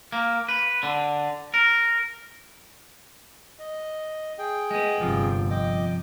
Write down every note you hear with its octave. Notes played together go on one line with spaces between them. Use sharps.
A#3
B4
D3
A#4
D#5
G#4 G5
G#3 B3
G1 F2 C3 F3
D#5 G5 D6